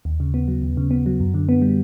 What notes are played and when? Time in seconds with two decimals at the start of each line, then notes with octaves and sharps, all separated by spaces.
0.05 D#2
0.20 C#3
0.34 B3
0.48 F#3
0.62 D#2
0.77 C#3
0.91 B3
1.06 F#3
1.20 F#2
1.34 D3
1.49 B3
1.62 G3